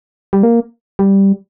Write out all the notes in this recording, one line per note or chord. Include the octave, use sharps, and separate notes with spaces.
G3
A#3
G3